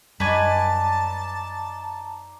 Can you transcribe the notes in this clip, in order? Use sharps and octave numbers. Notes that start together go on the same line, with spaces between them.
F#2 G3 D#4 B4 C#5 D5 G#5 A5